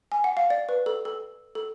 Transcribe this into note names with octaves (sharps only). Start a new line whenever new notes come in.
G#5
F#5
F5
D5
B4
A4
A4
A4